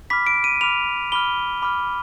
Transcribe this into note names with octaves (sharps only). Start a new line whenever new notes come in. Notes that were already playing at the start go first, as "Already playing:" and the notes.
B5 D6 F6 B6
D7
D#7
B5 D6 F6 F7
B5 D6 F6 G7
B5 D6 F6